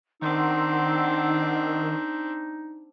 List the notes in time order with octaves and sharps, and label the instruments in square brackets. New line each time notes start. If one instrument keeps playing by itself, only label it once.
[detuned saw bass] D#3 [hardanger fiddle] C4 D4 [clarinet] D#4 [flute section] F#5 C6 E6